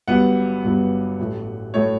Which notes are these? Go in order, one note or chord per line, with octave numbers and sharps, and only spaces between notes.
G1 G2 F#3 B3 F#5
G1 G2 F#3 B3
A1 A2 F#3 A3
A2 F#3 A3 C#5